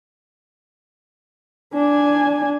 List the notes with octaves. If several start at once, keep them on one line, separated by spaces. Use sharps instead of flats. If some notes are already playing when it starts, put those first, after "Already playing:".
D4 G#5